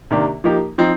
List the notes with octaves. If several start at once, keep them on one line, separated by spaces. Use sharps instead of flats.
C3 D#3 A#3 D4 G4
F3 A#3 D#4 G4
F3 C4 D#4